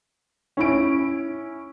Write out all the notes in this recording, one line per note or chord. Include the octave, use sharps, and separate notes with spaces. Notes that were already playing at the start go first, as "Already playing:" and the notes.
C#4 E4 D7